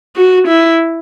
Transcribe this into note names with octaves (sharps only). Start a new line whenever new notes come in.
F#4
E4